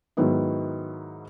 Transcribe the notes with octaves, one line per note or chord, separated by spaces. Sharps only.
G#2 D#3 F#3 B3 E4